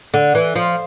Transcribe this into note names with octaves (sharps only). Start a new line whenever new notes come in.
D3
E3
F3